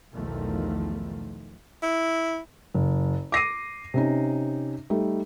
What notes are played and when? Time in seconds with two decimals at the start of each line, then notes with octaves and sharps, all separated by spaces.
0.14 B1 E2 D#3 F3 A3
1.83 E4
2.74 F#1
3.32 D6 A#6 C7 D#7
3.94 C3 C#4 D#4
4.90 G3 A3 D#4